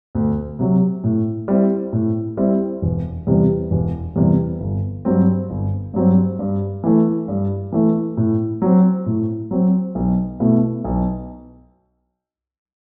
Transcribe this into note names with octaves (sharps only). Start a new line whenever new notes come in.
D2
C3 F#3
A2
G3 C4 E4
A2
G3 C4 E4
E1
E2 C3 G3
E1
E2 C3 G3
G1
G2 F#3 C4
G1
G2 F#3 C4
G2
E3 A3
G2
E3 A3
A2
F#3 C4
A2
F#3 C4
B1
B2 A3 E4
B1